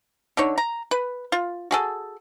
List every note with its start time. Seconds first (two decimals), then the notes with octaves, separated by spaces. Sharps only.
0.37 D3 D#4 C#5
0.58 A#5
0.91 B4
1.32 F4
1.71 F#4 G#4 A4